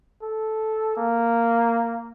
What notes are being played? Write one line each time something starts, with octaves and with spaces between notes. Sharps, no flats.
A4
A#3